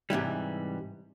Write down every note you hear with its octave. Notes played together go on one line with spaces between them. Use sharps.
G#2 C3 E3 G3